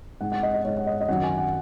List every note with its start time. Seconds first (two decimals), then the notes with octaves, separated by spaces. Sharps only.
0.21 G#2 G#3 F#5
0.32 F#5
0.43 D#5
0.54 D#5
0.64 G#2 G#3 C#5
0.76 F#5
0.87 D#5
1.01 D#5
1.08 F#2 D#3 F#3 F#5
1.23 G#5
1.38 F#5